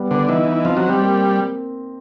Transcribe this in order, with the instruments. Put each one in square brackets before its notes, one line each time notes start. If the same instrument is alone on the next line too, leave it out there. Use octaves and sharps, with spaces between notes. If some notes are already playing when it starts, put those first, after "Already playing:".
Already playing: [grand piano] G3 B3
[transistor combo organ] D3 [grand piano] B3
[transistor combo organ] E3 [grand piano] D#4
[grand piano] D#4
[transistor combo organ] F3 [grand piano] C4
[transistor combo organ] F#3
[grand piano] C4
[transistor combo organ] G3
[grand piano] A#3